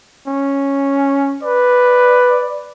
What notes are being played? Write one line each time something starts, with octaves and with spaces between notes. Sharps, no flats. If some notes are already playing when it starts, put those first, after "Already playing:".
C#4
B4 D5